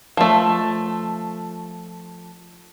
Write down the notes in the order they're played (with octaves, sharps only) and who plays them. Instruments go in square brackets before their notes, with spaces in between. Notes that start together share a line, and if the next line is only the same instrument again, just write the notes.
[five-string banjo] F3 A3